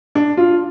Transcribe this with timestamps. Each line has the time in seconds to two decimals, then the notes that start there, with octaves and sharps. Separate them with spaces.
0.15 D4
0.37 F4